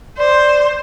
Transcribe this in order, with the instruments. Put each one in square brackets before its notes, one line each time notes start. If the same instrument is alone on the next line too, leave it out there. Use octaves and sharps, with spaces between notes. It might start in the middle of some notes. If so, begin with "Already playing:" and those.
[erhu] C5 [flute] D5